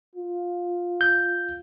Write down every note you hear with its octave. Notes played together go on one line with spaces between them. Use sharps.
F4
G6